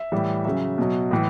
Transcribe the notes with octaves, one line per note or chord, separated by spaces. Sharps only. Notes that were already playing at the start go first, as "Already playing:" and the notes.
Already playing: E5
A2 E3 G3
C#3 F#3 E5
B2 F#3
A2 E3